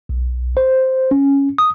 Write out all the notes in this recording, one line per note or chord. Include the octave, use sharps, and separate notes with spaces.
B1
C5
C#4
D#6